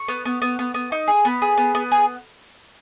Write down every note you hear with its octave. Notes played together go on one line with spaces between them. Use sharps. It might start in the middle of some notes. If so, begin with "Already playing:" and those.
Already playing: C#6
B3
B3
B3
B3
B3
D#4
G#4
B3 B5
G#4
B3
B3
G#4